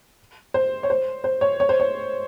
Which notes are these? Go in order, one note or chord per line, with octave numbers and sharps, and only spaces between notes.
C5
C#5
C5
C5
C#5
C#5
C5
C#5